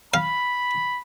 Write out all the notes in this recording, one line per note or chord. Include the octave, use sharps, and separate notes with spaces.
F5 B5